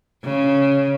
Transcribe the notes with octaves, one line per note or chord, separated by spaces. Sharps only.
C#3